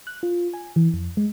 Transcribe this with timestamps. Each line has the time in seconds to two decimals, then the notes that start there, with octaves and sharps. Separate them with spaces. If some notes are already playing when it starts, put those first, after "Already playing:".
0.07 F#6
0.23 F4
0.54 G#5
0.76 E3
0.94 F2
1.17 G#3